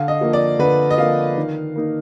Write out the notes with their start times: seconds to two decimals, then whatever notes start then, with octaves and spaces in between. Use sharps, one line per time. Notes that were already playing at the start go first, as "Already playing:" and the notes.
Already playing: D3 F5
0.08 D#5
0.21 F3 A#3
0.33 D5
0.59 D3 B4
0.91 D#5
0.98 F3 A#3 F5
1.37 D#3
1.76 A#3 D#4